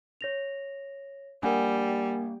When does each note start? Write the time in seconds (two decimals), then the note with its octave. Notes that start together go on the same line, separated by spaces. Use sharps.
0.21 C#5 A#6 F7
1.43 G3 A#3 D4 A#4 F#5 G#5